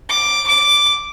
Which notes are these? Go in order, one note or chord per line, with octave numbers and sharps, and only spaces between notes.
D6
D6